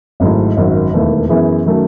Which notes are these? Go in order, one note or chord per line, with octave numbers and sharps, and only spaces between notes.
G#1 G#2 F#3 A3 E4
G#1 F#2 D#3 F#3
E1 D#2 D#3 A3 E4
F#2 E3 B3 E4 G#4
D#3 F#3 A3 C#4